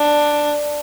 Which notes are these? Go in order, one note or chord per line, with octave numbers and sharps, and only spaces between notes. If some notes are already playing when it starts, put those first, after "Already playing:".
Already playing: D4